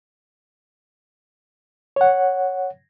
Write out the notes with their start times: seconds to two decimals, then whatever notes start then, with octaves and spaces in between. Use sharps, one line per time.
1.96 C#5 F#5